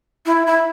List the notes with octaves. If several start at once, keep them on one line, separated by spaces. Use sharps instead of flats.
E4
E4